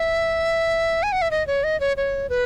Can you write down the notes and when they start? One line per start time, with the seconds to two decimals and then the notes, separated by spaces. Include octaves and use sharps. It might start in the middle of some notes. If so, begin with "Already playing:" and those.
Already playing: E5
1.03 G#5
1.12 F#5
1.22 E5
1.31 D#5
1.47 C#5
1.64 D#5
1.80 C#5
1.97 C#5
2.30 B4